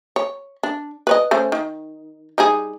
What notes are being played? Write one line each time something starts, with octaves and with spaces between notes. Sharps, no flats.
C#5
D4
B4 C#5 D#5
A3 C#4 C5
D#3
G3 D#4 G#4